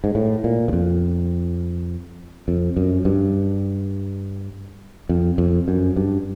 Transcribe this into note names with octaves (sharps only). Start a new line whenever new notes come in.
G#2
A2
A#2
E2
F2
F2
F#2
G2
F2
F2
F#2
G2